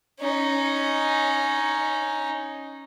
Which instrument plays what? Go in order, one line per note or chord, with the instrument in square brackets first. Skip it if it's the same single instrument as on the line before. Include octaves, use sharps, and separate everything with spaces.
[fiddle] C#4 D#4